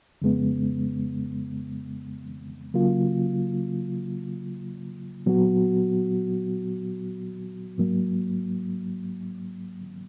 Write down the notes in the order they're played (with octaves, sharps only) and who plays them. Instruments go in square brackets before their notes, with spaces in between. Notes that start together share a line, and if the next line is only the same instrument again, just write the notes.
[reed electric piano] F2 C#3 G#3 B3
C#3 F#3 A#3 F4
A#2 F#3 B3 F#4
G#2 F#3 A#3